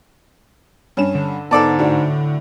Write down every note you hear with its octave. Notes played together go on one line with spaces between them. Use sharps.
G2 C#4 E7
D3
G#2 B3 A4 D5 A5
A2 D4 F#4